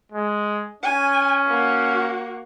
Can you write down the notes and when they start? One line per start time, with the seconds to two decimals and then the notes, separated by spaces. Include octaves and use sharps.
0.12 G#3
0.83 C#4 G#5
1.47 A#3 F#4